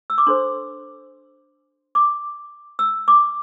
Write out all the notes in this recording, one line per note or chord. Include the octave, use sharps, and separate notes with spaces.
E6
D6
D4 A4 C5 C6
D6
E6
D6